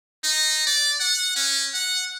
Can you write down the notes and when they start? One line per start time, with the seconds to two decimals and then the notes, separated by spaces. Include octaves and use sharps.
0.24 D#4
0.67 D5
1.00 F#5
1.36 C#4
1.74 F#5